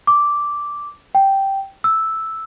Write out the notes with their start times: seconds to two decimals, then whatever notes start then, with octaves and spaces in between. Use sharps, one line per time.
0.07 D6
1.15 G5
1.84 E6